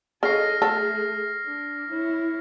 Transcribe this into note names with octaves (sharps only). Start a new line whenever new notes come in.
C#3 A4 D#5 F6 A#6 C7
A3 G#4 A4
D4
E4 C#5